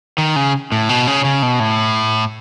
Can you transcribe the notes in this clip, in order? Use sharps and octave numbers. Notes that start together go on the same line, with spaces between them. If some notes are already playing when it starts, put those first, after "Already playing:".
D#3
C#3
A2
B2
C#3
C#3
B2
A2